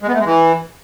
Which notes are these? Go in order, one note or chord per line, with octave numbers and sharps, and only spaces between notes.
G#3
B3
A3
G#3
E3